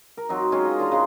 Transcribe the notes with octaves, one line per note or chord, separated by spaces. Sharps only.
A#4
F#3 C4 D#4
G#3 C#4 F4 C5
D#5
D4 D#5 A#5 C6
C#3 G#3